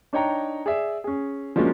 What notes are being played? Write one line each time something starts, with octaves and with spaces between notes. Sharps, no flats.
D4 D#4 C#5 G5 A#5
G#4 D5 E5
C#4 G#4
F3 F#3 G#3 A#3 C#4 D4